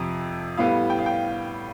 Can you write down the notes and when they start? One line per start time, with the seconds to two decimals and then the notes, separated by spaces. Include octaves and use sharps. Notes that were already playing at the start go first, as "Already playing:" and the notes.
Already playing: F2 C3 F3
0.58 A2 G3 B3 F5
0.90 G5
0.99 F5
1.06 G5